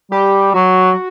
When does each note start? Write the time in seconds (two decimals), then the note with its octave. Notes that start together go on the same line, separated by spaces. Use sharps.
0.11 G3 G4
0.54 F#3 F#4